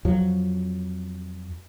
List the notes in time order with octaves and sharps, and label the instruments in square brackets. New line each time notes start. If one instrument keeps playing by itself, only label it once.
[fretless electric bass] F2 F3 F#3